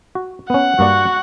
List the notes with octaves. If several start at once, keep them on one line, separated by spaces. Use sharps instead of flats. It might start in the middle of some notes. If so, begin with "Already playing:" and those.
F#4
B3 C#4 F#5
G2 A#3 F#4 D5